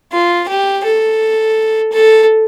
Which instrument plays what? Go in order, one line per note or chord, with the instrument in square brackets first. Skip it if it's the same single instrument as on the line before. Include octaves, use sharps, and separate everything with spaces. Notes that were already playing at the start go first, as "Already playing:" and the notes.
[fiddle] F4
G4
A4
A4